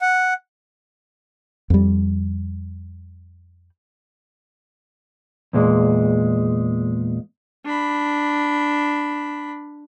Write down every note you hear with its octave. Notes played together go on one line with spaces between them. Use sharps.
F#5
F2 G3
E2 A#2 G#3
D4 B5